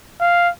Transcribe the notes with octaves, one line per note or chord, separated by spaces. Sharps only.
F5